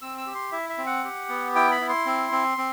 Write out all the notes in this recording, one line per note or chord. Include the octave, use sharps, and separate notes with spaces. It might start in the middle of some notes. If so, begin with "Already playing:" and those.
C4 E6
E6
G4
C6
E4 E5
E5
C4
F#5
G4
B3
E4 G5
B5
E4
C6
C4
C4
C4